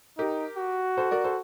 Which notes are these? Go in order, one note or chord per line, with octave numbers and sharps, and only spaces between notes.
D#4 G4 A#4
F#4
A4 C5
A#4 D5
A4 C5